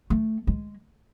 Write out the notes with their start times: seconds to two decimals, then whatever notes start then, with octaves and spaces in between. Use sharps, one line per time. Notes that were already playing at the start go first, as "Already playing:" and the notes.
0.10 A3
0.47 G#3